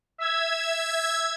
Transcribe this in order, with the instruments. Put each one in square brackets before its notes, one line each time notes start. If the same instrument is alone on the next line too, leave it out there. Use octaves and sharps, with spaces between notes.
[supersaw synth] E5 E6 G#6